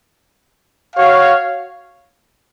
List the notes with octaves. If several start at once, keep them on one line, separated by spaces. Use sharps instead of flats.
F#4 C#5 F5